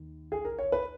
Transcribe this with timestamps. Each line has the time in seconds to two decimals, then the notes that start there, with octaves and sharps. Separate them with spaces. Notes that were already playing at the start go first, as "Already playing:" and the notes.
Already playing: D#2
0.32 G#4
0.45 A#4
0.58 C#5
0.72 B4